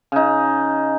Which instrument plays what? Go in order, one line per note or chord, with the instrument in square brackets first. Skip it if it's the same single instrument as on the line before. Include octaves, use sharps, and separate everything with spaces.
[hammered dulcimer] C#3 D#4